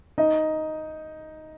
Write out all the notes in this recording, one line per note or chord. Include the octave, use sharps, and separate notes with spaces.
D#4 D#5